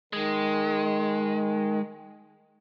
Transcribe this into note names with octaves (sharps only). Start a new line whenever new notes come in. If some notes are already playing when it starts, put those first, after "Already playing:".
D#3 G#3